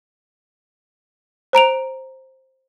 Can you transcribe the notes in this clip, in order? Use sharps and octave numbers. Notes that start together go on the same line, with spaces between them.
C5 A#5 D7 F7